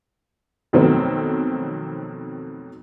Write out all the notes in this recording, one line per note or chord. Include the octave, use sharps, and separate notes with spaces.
F2 B2 D#3 F#3 A3 C4